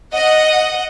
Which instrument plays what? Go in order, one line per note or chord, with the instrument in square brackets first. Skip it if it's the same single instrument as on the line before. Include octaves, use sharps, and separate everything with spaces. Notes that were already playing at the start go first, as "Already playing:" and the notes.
[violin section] D#5 F#5